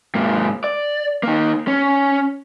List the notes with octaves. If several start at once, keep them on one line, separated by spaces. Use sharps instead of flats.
G#2 A#3
D5
A#3 D#4
C#4